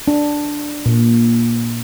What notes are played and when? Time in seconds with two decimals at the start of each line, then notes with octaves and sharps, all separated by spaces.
0.08 D4
0.86 A#2